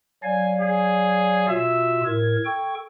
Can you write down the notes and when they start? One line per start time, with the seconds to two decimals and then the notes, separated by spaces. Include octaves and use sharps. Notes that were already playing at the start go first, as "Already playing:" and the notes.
0.23 F#3 D5 F5 G#5
0.61 G#4
1.48 B2 F4 E5
2.05 A2 A#4 G#6
2.45 A4 G5 C#6